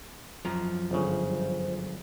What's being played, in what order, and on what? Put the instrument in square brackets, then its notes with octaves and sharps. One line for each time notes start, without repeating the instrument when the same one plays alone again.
[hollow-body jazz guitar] F#2 F3 A#5
[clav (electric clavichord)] G1 C#3 [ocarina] C5